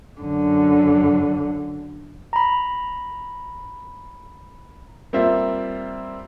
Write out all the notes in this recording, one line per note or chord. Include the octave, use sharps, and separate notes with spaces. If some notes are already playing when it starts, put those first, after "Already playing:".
F#2 D3
A#5 B5
G3 A#3 C4 F4 C5 E5